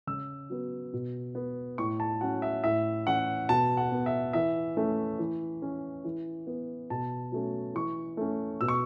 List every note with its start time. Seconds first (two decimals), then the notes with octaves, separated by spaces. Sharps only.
0.07 C#3 E6
0.50 F#3 B3
0.93 B2
1.35 B3
1.78 A2 C#6
2.00 A5
2.21 F#3 C#4 F#5
2.42 E5
2.64 A2 E5
3.07 E3 C#4 F#5
3.49 B2 A5
3.77 F#5
3.92 B3
4.06 E5
4.33 E3 E5
4.77 A3 C#4
5.19 E3
5.62 C#4
6.05 E3
6.47 B3
6.90 B2 A5
7.32 F#3 A3 C#4
7.75 E3 C#6
8.17 A3 C#4
8.61 B2 E6
8.68 C#6